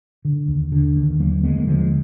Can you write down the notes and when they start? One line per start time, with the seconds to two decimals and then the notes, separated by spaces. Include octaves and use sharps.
0.25 D3
0.48 D#2
0.72 D3
0.96 D#2
1.19 D3 F#3 A#3
1.43 D#2 G#3 B3
1.55 A#3
1.67 D3 F3 G#3